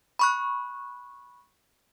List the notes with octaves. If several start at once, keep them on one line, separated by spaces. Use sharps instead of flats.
B5 C#6 F#6